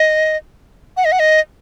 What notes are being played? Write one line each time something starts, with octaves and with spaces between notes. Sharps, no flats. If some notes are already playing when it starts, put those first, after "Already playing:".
Already playing: D#5
F#5
D#5
F#5
D#5